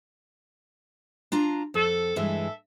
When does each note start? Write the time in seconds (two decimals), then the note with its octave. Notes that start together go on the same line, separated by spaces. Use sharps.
1.32 D4 F4 A#5
1.74 F2 A4
2.16 G2 E3 G#3 A4 E5